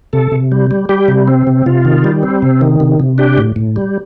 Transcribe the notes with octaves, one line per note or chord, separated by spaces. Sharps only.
C3 A4
C3
G3
G3
G3 G4
C3
C4
C3
C3 F4
D#3
G3
C4
C3
D#3
C3
C3
D4 G4
A2
A2
G3